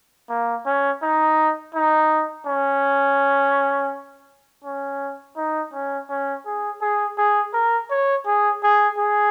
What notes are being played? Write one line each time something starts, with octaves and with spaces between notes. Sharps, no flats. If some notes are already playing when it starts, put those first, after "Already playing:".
A#3
C#4
D#4
D#4
C#4
C#4
D#4
C#4
C#4
G#4
G#4
G#4
A#4
C#5
G#4
G#4
G#4